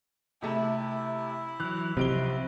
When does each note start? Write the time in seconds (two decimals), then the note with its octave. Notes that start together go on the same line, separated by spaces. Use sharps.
0.42 C3 A3 E4
1.60 E3 F#3 F#6
1.97 B1 C3 F3 D7 G7